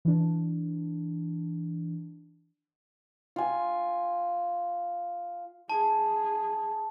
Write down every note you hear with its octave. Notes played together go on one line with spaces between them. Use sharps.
E3 D4
F4 G#5
G#4 A5